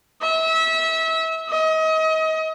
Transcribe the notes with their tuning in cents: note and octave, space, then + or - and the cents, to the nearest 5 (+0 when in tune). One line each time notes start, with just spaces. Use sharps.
E5 -30
D#5 +35